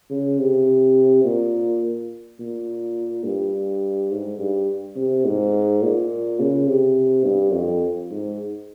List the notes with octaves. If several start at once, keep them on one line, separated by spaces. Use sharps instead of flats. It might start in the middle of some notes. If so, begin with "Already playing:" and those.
C#3
C3
A#2
A#2
G2
G#2
G2
C3
G#2
A#2
C#3
C3
G2
F2
G#2